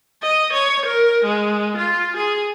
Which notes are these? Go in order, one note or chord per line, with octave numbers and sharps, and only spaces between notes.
D#5
C#5
A#4
G#3
F4
G#4